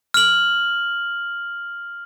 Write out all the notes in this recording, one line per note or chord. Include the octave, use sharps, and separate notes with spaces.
F6 F#7